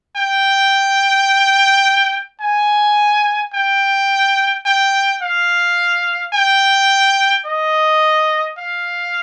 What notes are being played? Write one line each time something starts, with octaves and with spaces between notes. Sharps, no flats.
G5
G#5
G5
G5
F5
G5
D#5
F5